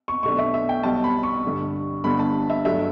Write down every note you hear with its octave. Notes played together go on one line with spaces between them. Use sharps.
C#6
B1 B2 A3 D4 C#6
E5
E5
G5
B1 B2 G3 A5
B5
C#6
G2 D3 G3
G1 G2 D3 B5
A5
E5
G2 F#3 A3 D4 E5